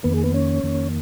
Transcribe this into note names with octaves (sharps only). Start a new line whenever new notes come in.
F2 D#3 A#3 B3 B4
G#4
B3 B4
C#4 C#5
F2 D#3 A#3